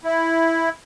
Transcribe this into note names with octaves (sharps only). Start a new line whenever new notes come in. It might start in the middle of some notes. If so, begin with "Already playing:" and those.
E4